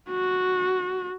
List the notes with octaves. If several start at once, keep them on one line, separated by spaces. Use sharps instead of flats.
F#4